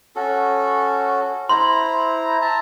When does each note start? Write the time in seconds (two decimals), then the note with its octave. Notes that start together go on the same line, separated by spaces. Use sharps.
0.16 C#4 F#4 A4
1.49 E4 C5 A#5 C6
2.42 E5 A5 A#5